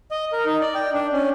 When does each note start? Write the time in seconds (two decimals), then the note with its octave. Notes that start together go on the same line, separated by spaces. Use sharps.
0.11 D#5
0.32 A#4
0.46 D#4
0.61 D5
0.75 G5
0.93 D4
1.13 C#4